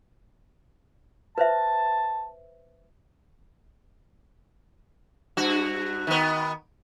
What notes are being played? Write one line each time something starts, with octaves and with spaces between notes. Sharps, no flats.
B4 C5 E5 A5
G2 F#4
D#3 B3